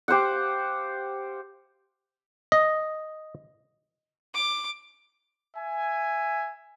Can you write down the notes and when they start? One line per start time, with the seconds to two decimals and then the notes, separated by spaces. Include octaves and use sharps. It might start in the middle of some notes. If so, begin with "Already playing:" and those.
0.08 G4 C5 F5 F#5
2.52 D#5
4.34 D6
5.56 E5 G#5